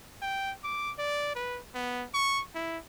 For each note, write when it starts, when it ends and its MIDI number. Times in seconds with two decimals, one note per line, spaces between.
0.22 0.52 79
0.64 0.92 86
0.98 1.33 74
1.35 1.60 71
1.75 2.05 59
2.14 2.42 85
2.55 2.78 64